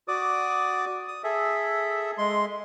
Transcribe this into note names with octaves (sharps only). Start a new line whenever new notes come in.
F#4 D5 D6 D#6
D#6
G#4 A4 E5
G#3 C6